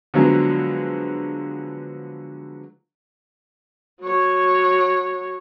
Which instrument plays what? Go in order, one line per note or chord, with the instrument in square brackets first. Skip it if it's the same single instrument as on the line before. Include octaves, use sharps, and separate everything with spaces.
[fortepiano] D3 F3 F#3 G#3 B3
[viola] F#3 C#5